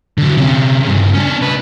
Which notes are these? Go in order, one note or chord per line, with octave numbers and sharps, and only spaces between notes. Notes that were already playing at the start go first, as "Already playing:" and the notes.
D3 F#3
C3 C#4
G2 C#3
C#4 D4
C#3 B4